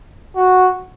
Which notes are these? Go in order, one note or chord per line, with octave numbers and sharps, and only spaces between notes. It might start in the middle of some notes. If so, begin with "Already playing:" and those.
F#4